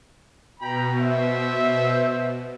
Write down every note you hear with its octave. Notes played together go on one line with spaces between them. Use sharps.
B2 G5 A#5 B5
C5 E5